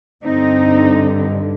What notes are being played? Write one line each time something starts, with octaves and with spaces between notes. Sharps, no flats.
G2 D3 C4 D#4